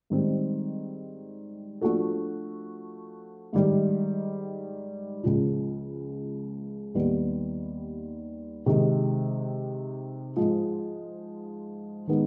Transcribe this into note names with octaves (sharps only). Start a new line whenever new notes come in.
G#2 D#3 G3 C4
F3 A3 D4 F#4 A4
G#2 D#3 G3
C#2 C#3 F3
D#2 D#3 G3 B3
C3 D#3 G#3
G#2 F3 G#3
D#3 G#3 B3 D#4